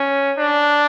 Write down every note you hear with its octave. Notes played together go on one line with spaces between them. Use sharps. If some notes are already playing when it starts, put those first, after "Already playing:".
Already playing: C#4
D4